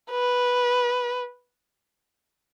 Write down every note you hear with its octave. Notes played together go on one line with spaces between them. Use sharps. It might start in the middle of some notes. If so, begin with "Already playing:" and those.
B4